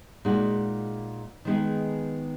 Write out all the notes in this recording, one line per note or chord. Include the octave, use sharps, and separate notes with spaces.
A#2 G#3 D#4 F#4
D#3 G#3 B3 D#4 G#4